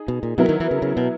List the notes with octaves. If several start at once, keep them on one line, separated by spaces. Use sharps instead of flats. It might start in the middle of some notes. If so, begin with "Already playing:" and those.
Already playing: D#4 G#4
B2
A#2
B2 F#3 B3 E4 A#4
D#3
E3
C#3
C#3
B2